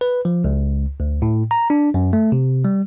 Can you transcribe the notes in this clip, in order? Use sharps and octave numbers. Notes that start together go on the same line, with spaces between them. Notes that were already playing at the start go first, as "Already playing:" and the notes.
B4
F3
C#2
D2
A2
A#5
D4
F#2
A3
C3
G3